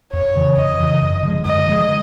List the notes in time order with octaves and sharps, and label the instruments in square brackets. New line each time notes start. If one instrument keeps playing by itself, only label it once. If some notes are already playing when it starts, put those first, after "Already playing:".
[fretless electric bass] F2 [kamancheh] C#5
[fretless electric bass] C#3 E3
[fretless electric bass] F2 [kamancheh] D#5
[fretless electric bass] C#3 E3
F#2
D3 F3 G#3
[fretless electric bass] F#2 [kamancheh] D#5
[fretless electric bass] D3 F3 G#3